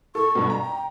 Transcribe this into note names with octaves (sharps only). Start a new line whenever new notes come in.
A4 C#6
G2 B2
A#5
G5